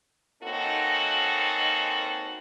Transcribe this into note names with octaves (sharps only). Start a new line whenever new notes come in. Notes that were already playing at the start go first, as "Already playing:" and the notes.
A#3 C4 C#4 D#4 F#4 A4